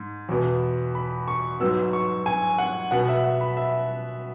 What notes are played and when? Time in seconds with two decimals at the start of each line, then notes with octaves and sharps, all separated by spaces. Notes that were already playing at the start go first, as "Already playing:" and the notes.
Already playing: G#2
0.29 E2 B2 B3
0.95 B5
1.28 C#6
1.60 G#2 F#3 B3 E6
1.93 C#6
2.26 G#5
2.58 F#5
2.91 B2 B3 F#5
3.08 E5
3.24 F#5
3.41 B5
3.57 E5